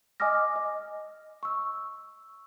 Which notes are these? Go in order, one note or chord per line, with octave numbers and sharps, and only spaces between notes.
D#5 G#5 D6 D#6 F6 A#6
D#5
C#6 E6